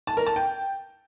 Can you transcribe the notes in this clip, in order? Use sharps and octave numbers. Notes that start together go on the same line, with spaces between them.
A5
A#4
A5
G5